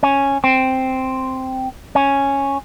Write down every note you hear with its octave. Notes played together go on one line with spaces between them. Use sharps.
C#4
C4
C#4